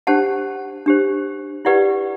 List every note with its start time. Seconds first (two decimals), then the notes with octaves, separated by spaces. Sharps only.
0.07 D4 G4 C5 F#5 A5
0.86 D4 G4 C5
1.65 E4 G4 B4 D5 F#5